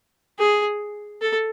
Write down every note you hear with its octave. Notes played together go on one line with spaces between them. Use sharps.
G#4
A4